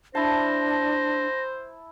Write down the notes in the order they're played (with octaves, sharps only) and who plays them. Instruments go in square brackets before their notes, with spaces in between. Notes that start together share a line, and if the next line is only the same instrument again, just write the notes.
[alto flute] D4 [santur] E4 A5 [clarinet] C5 [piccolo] A#6